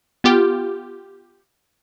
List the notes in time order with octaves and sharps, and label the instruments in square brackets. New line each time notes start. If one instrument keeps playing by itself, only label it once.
[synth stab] B3 F4 G4